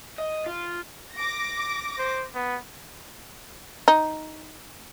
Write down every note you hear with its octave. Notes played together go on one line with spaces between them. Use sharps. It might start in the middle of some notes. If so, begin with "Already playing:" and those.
D#5
F4
D6 A#6
C5
B3
D#4